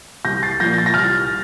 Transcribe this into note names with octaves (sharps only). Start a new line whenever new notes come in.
C2 G6 A#6
A6 C7
A#2 F3 G6 A#6
A6
A#6
C2 F6 A6